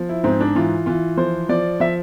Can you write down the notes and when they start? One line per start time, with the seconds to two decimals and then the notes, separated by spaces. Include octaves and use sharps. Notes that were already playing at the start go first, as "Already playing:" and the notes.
Already playing: F3
0.09 E4
0.24 G#2 C4
0.40 D4
0.55 E3 F4
0.86 E3 F4
1.17 F3 C5
1.49 F3 D5
1.80 F3 E5